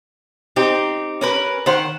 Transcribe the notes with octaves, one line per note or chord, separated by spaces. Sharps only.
C4 D#4 G4
C#4 A#4 B4
D#3 C5 F#5